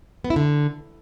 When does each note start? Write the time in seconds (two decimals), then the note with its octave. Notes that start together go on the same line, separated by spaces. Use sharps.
0.24 B3
0.30 E4
0.36 D3